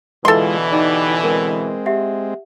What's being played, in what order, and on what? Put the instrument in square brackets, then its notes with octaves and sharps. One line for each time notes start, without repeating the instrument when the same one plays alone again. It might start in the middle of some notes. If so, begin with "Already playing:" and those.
[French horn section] B2 D3 E3 [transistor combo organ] G#3 F4 [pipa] A4 C6
[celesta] D#4 D#5 [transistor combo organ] G4 B4 D5
[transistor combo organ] G#3 C4 [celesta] A#4
[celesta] G4 E5 F#5